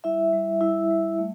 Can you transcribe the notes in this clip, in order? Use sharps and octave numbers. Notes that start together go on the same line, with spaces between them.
G3 E4 E5
G3
G3 E4 E5
G3
A3